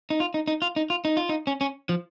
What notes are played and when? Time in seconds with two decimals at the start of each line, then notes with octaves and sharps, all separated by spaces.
0.10 D#4
0.20 F4
0.34 D#4
0.48 D#4
0.62 F4
0.76 D#4
0.90 F4
1.05 D#4
1.17 F4
1.29 D#4
1.47 C#4
1.61 C#4
1.89 F3